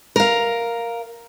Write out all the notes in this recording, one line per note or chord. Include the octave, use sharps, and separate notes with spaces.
A#4 F5